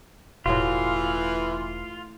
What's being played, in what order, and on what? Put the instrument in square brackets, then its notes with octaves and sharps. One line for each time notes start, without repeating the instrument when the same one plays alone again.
[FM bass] E1 [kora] A2 F#4 [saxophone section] E3 [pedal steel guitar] F4